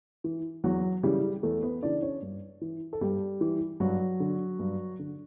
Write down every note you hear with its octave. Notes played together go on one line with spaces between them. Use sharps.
E3
E2 F#3 F#4
C#3 E3 G3 G4
E2 A3 A4
B3 B4
C#3 E3 D4 D5
C#4 C#5
G2
E3
A4
G2 G3 G4
E3
G2 F#3 F#4
D3
G2
D3